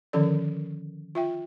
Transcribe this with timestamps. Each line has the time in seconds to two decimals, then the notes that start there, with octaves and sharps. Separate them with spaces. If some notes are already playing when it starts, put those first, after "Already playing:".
0.13 D3 D#3 F3 C#4 A4 D5
1.15 F4 E5 G5